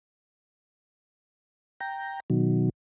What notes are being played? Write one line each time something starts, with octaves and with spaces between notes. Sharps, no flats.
G5 A#5
B2 D#3 F#3